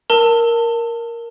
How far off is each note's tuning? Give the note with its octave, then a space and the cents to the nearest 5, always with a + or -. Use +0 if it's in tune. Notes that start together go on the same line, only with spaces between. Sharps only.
A#4 +0 A5 +25 E6 -10